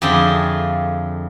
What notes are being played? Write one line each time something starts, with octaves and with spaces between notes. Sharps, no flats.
F2 D3 G#4 C5 E5 G5